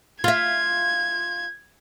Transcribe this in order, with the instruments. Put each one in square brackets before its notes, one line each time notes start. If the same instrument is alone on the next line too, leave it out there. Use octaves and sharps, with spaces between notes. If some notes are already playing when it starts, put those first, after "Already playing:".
[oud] F4 E5 [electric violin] G#6